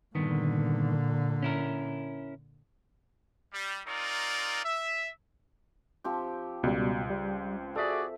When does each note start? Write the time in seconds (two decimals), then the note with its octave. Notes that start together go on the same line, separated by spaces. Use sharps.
0.15 G2 A#2 D3 D#3 B3
1.42 C#4 E4 A#4
3.52 G3
3.86 C4 D#4 F4 A#4 D5
4.64 E5
6.04 F3 C4 G4
6.63 C#2 B2 G3
7.10 G3
7.76 F#4 G#4 A4 D5 E5